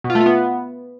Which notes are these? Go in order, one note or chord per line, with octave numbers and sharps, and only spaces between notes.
B2
F4
A3
F4
B3